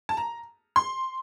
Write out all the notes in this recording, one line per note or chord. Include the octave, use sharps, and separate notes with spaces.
A5
A#5
C6